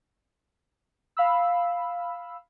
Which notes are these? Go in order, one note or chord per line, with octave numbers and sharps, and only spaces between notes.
F5 B5 E6